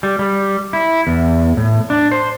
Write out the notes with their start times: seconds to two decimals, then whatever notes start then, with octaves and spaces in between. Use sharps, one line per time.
0.03 G3
0.19 G3
0.73 E4
1.07 E2
1.57 A2
1.90 D4
2.11 C5